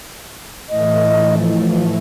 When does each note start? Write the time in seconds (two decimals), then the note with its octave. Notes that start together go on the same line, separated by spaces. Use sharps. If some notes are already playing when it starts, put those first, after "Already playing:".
0.69 A2 E3 A3 D#5
1.38 F3